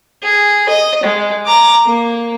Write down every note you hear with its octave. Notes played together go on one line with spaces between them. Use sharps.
G#4
D#5
G#3
A#5 D6
A#3